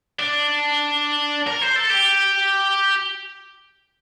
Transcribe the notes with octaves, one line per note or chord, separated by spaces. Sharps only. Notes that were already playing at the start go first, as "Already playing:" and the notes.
D4
A#4
C5
A4
G4